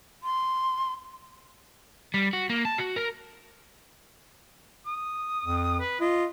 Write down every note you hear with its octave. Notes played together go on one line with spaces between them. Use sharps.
C6
G3
F#4
A#3
A5
F#4
A#4
D#6
F2
B4
F4 D#5